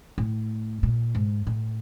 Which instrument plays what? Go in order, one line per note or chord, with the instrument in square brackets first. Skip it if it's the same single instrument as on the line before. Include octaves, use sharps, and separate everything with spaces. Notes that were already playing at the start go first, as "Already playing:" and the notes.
[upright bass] A2
A#2
G#2
A2